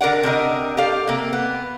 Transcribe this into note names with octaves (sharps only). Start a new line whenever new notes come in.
D3 A#4 B4 D5 F#5
C3 D4 A#4 D#5
G4 A4 D5 F5
C3 A#3
B3